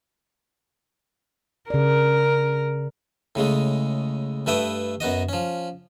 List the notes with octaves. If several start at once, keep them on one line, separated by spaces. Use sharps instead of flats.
C#3 A#4 D5
A2 C#3 G#3 A3
G2 A3 B4 E5 G5 D#6
F#2 B3 F#4 D#5
F3 C#4